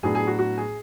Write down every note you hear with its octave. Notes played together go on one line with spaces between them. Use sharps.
A2 F#3 B3 D4 G#4
G#4
F#4
F#4
G#4